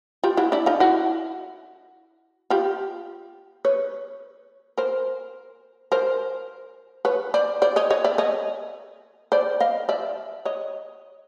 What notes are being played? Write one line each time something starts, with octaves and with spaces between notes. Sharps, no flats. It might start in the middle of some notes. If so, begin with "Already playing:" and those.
F4 G4
E4 F#4
D4 E4
D#4 F4
E4 F#4
F4 G4
B4 C#5
A#4 C5
A#4 C5
B4 C#5
C5 D5
C5 D5
C#5 D#5
C#5 D#5
D5 E5
C#5 D#5
C5 D5
D#5 F5
D5 E5
C#5 D#5